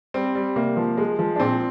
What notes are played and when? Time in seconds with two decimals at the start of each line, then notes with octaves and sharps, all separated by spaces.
0.14 G3 C4
0.35 G3
0.56 C3 A#3
0.77 F3
0.98 G#3
1.19 F3
1.36 D4
1.40 A#2 C4